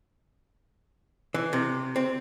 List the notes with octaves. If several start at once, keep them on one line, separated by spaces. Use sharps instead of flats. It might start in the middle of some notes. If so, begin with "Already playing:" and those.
E3
C3
C4